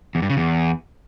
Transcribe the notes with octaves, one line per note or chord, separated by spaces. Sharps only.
E2
G2
C#3
E2